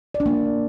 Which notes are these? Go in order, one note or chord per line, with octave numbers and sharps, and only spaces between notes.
D5
D4
A#3